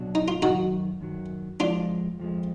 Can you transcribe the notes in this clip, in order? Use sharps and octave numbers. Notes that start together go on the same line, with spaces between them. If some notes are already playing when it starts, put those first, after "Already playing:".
Already playing: B2 F#3 D4
D#4
F4
F#2 D#3 F#3 D#4 F#4
F#2 D#3 F#3
F2 F3 G#3 D4 F4
F2 F3 G#3